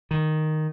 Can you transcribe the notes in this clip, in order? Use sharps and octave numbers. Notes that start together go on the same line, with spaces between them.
D#3